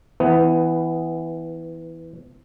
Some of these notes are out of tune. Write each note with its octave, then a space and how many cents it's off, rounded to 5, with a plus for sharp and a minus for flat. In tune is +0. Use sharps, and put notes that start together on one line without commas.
E3 -10 B3 +15